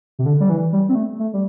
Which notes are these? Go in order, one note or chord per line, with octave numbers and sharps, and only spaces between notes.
C3
D3
G3
E3
G3
C4
A3
A3
G3